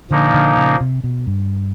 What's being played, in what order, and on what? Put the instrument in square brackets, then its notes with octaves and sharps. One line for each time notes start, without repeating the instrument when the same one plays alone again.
[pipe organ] A#2 F3 A#3 D#4 [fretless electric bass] D3
[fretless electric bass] D3
C#3
C3
B2
G2